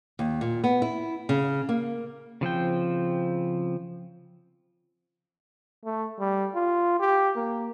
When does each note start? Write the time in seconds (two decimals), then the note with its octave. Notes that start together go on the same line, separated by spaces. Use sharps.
0.19 D#2
0.41 A#2
0.64 B3
0.82 E4
1.29 C#3
1.69 A#3
2.41 C#3 F3 C4 G5
5.85 A3
6.20 G3
6.55 F4
7.00 G4
7.35 A#3